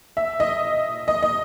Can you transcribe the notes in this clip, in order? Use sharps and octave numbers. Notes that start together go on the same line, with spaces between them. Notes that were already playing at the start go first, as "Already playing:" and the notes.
E5
D#5
D#5
D#5